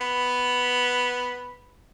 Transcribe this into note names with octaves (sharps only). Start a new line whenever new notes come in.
B3 B5